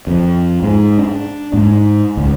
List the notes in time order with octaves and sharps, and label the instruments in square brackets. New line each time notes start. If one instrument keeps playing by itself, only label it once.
[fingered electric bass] F2
G#2
D4
G#2
C#2